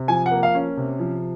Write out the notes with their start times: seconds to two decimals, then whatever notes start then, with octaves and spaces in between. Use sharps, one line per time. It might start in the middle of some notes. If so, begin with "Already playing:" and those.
Already playing: C3
0.08 F3 G#5
0.26 F#5
0.31 A#3
0.43 F5
0.55 C#4
0.77 C3
0.99 F3